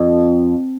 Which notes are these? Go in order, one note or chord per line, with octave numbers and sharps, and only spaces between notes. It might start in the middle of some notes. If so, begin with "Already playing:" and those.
Already playing: F2